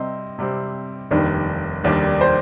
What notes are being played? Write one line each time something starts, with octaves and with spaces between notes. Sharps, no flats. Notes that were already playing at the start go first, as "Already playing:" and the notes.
Already playing: C3 G3 C4 D#5
C3 G3 C4
F1 D#2 D#3 G3 D4
F1 D#2 D#3 G3 D4 D5
C5